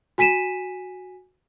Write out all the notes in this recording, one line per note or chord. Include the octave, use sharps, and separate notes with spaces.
F#4 G#5 B6 D#7 E7